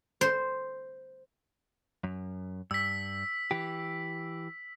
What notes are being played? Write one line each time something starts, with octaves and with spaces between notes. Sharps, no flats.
C5
F#2
G2 E6 B6
E3 G4